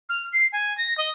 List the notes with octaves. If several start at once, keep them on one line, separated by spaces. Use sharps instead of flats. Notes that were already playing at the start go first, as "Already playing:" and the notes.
F6
C7
G#5
A#6
D#5